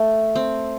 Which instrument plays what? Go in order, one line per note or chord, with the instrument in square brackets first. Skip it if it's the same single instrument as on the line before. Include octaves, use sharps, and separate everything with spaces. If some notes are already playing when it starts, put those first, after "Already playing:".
Already playing: [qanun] A3
C4